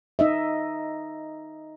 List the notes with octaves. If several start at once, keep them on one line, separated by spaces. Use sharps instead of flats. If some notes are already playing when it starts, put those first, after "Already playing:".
D#4 D#5 E5